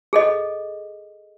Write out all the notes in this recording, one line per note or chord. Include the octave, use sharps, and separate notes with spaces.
G#4 A4 D#5